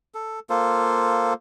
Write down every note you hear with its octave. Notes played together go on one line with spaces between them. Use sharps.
A4
A#3 F4 A4 C5